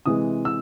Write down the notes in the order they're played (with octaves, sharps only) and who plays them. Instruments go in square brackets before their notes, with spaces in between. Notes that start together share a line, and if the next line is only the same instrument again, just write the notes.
[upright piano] C3 E3 G#3 D#6
E6